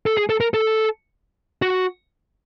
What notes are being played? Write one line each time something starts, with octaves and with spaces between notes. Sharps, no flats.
A4
G#4
A4
A#4
A4
F#4